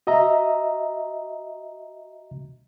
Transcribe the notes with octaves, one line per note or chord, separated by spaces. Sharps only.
F#4 D#5 E5 A#5